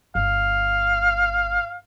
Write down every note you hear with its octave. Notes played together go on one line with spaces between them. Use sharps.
G1 F5